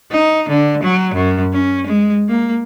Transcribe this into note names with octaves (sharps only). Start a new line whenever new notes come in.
D#4
D3
F#3
F#2
C#4
G#3
A#3